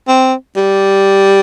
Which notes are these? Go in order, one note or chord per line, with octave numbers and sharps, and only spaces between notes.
C4
G3